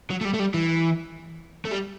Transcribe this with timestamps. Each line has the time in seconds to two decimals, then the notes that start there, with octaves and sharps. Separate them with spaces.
0.10 F#3
0.21 A3
0.25 G3
0.34 A3
0.40 G3
0.54 E3
1.65 A3
1.71 G3